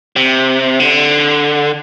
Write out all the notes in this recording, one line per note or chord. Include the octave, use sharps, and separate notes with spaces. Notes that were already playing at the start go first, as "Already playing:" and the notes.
C3
D3